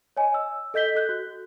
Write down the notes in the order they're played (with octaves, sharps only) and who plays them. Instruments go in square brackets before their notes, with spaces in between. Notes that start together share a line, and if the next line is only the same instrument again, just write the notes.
[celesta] C#5 D#5 G#5
E6
A4 D#5 G6 B6 G7
A4 F#6 G6
F#4